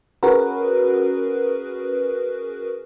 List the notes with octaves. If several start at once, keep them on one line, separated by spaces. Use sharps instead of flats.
C#4 F#4 G#4 A#4 B4